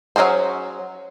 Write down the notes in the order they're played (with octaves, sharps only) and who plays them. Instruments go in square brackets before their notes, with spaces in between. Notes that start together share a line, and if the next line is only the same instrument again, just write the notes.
[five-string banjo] F#3 A3 C#4 G#4 C5